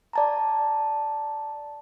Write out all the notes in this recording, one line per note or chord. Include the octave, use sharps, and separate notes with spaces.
D5 A5 A#5